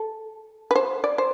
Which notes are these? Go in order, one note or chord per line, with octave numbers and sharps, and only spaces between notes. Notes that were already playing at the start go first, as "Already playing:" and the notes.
Already playing: A4
B4
C5
D5
C5